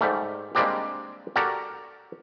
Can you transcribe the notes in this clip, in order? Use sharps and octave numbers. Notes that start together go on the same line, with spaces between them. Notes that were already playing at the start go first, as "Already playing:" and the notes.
G#2 G3 A3
G3 G#3 A#3 C4 D4 G4
F#4 G4 A4 A#4 D5